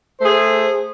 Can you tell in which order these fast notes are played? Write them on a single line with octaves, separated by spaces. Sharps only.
C5 A3 G#4